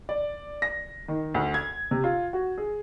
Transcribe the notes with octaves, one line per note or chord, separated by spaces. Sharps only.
D5
A#6
D#3
D2
G#6
C3
F4
F#4
G#4